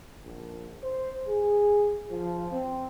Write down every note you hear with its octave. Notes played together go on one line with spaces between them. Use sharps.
A#1
C5
G#4
F3
C4